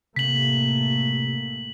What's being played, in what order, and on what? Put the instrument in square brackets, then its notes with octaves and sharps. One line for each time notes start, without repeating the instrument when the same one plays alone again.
[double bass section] A1 A3 A#3 [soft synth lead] C3 [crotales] B6 F#7